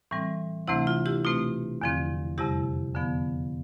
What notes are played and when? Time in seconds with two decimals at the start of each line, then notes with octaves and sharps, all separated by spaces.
0.11 A2 E3 G3 C4
0.68 D2 C3 E3 A3 C4 E4
0.87 F4
1.06 E4 G4
1.25 B2 A3 C4 F4
1.82 E2 D3 F3 C4
2.38 F2 C3 G3 E4 G4
2.95 F2 D3 F3 B3